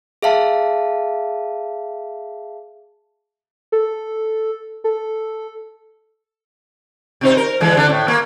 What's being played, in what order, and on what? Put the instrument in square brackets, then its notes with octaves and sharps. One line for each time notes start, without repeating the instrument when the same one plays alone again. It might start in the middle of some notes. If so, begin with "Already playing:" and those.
[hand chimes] G#4 E5 F5 A5
[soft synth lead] A4
A4
[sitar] C3 D#4 C5
A#4
D3 E3 G#3
D3 D4
A2
A#3